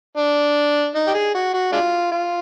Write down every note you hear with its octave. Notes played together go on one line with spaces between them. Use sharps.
D4
D#4
G4
G#4
F#4
F#4
G#3 D4 F4
F4